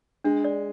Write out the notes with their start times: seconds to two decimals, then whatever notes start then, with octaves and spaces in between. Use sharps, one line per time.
0.24 G#3 D4
0.44 D5